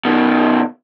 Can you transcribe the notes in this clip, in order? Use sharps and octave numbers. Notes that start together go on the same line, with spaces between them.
B2 D#3